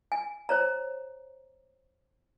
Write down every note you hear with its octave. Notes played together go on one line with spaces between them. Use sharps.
G#5
C5 C#5 A#5